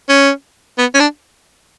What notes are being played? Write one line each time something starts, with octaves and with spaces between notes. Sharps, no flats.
C#4
B3
C#4
D4